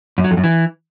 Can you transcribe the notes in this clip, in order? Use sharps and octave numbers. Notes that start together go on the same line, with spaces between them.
F#2
F#3
F2
F#2
E3